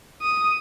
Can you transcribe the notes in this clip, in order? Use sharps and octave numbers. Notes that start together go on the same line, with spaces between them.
D#6